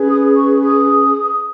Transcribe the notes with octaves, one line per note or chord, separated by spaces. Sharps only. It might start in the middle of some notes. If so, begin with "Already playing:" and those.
Already playing: C#4 G#4 B4
D#6
C#6
D#6